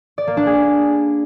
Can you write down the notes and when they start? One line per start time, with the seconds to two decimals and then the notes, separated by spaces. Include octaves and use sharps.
0.18 D5
0.27 A#3
0.37 D4
0.47 G#4